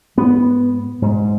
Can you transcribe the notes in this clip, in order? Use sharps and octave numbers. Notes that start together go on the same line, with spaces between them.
G#2 B3
G#2